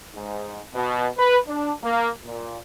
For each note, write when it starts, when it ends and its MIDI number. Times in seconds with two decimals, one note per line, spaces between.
0.15 0.61 44
0.74 1.07 47
1.18 1.37 71
1.47 1.72 62
1.83 2.10 58
2.25 2.57 46